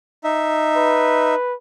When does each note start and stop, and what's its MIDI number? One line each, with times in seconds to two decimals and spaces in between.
0.24 1.35 63
0.24 1.35 76
0.77 1.54 71